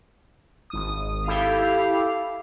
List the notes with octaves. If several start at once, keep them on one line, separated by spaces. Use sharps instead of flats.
G#1 D#6
E4 G4 A4 F5